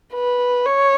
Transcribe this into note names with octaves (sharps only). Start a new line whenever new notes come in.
B4
C#5